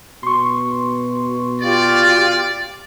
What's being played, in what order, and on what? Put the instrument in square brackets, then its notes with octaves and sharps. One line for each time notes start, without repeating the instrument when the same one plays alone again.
[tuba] B2 [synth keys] C6 C#6
[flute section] F4 G4 [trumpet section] D5